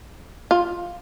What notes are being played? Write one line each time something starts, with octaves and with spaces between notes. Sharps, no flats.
F4